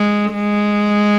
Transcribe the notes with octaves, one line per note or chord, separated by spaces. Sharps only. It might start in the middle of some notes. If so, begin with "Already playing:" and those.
Already playing: G#3
G#3